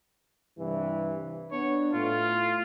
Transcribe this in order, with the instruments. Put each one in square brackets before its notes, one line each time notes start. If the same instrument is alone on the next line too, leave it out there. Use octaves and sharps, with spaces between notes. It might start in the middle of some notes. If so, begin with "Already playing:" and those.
[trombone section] G2 C3 E3
[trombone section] B3 D4 [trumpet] C#5
[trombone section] A2 [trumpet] F4